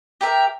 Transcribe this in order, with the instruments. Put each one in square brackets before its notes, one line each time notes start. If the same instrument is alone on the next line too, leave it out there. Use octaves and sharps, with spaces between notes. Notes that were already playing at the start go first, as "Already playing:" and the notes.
[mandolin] G4 A#4 E5